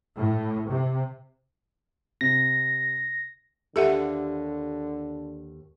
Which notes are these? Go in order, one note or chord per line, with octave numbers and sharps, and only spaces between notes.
A2
C3
C3 A#6
D#2 D3 G4 A4 E5 F#5